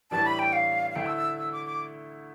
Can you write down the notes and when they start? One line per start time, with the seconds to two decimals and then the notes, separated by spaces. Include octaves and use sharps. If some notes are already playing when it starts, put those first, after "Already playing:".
0.11 A2 E3 G3 D4 A5
0.25 B5
0.39 G5
0.53 F5
0.91 F5
0.96 D2 D3 A3 E4 G5
1.06 E6
1.17 E6
1.38 E6
1.52 D6
1.66 D6